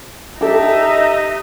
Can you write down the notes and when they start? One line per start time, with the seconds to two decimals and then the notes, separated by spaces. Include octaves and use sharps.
0.41 D#4 G4 A4 E5
0.87 D#5